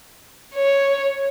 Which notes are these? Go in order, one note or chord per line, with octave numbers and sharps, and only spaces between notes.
C#5